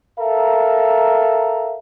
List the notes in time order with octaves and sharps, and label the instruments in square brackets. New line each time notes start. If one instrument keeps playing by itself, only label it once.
[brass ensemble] A4 A#4 E5 F5 A#5